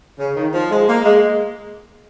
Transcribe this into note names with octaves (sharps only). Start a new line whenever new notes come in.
C#3
D#3
F3
G#3
A#3
G#3